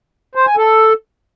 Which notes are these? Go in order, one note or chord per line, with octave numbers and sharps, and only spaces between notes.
C5
G#5
A4